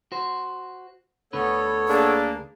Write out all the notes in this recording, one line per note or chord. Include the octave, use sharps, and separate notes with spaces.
F#4 C5
D2 D3 B3 A4 B4 C#5
A#3 D4 G#4